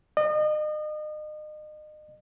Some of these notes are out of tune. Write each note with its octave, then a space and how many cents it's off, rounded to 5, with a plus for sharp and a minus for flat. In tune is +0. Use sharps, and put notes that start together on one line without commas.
D#5 -35